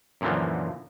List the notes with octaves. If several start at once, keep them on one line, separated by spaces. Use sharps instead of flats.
F#2 A#2 D3 E3 F3